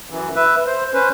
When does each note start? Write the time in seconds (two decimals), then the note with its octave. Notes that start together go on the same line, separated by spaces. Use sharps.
0.10 F#2 E3
0.36 B4 E5
0.67 C5
0.94 C#4 B4 C5